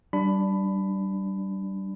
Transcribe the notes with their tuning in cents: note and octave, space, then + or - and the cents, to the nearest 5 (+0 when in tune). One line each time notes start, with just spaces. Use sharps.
G3 -25 D4 +0 B5 +15